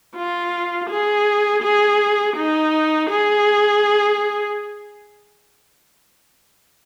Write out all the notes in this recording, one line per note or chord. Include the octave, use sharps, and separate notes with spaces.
F4
G#4
G#4
D#4
G#4